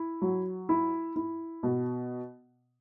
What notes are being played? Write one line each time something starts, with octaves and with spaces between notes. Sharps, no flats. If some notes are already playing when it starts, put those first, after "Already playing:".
Already playing: E4
F#3
E4
E4
B2